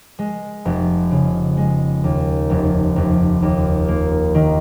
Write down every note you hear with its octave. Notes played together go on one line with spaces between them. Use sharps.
G#3
F1
C#3
G#3
D#2
F1
F1
D#2
A#3
D#3